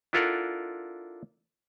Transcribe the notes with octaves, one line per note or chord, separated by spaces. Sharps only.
D4 E4 F4 A4 A#4 F#5